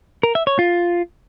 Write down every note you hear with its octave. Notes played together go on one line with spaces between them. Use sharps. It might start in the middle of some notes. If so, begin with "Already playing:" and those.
A#4
E5
C#5
F4